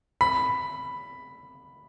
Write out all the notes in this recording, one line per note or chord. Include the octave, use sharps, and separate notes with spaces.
B5